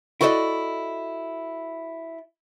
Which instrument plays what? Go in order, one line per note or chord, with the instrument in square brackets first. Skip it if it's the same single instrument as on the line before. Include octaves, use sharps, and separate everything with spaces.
[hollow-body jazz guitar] E4 F#4 A4 B4 D5 D#5